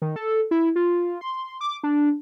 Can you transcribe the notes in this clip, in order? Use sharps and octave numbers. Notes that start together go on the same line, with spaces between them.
D#3
A4
E4
F4
C6
D6
D4